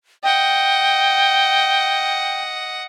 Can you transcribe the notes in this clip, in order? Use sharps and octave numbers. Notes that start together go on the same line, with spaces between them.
D#5 F#5 G5